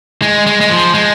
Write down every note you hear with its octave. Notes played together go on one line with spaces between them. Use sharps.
G#3
G#3
G#3
F3
G#3